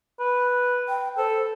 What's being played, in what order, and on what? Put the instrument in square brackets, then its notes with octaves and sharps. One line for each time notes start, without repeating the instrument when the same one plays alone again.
[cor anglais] B4
[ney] G5
[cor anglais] A4 [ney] C5